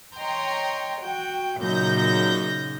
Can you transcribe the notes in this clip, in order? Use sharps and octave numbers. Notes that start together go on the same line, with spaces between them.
C#5 D#5 G5 A#5 C6
F#4 G5
F#2 A#2 C#3 D#4 G6 A#6